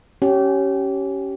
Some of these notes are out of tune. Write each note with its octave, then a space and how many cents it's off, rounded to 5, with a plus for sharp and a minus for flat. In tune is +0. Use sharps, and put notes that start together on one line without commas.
C#4 +0 G4 -25